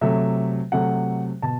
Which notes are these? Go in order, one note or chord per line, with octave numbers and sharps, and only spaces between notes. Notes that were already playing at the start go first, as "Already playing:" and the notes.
C3 F#3 A3 E5
C3 F#3 A3 F#5
B2 A5